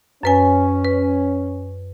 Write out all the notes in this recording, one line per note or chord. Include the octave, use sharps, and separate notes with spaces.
F#2 C#4 B4 G#5
B4